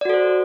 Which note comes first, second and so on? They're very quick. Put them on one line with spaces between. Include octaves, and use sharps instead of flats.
D5 F#4 A4 C5